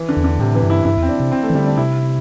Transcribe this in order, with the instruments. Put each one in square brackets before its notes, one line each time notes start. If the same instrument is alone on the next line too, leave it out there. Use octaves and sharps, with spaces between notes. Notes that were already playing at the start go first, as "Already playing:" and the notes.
Already playing: [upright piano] E3
D3
[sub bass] E2
[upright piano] D3
[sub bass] A2 [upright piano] C3
[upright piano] E3
[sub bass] G2
[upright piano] E4
[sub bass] G2 [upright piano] E4
[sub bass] E2
[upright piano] C4
D4
[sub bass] C3
[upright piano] C4
A3
[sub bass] E3
[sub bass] D3 [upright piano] G3
[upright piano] D4
[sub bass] C3 [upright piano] E4